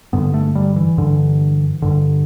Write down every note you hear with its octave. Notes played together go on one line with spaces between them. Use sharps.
G2 D3 B3
A3
G3
E3
G2 D3
G2 D3